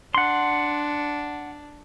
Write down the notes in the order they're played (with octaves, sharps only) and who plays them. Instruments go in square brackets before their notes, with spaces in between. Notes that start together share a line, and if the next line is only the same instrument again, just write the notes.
[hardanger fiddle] D4 [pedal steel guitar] F#5 C6